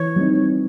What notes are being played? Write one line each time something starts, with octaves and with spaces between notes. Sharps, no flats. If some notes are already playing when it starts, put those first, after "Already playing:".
Already playing: E3 C#5
G3 C4 D#4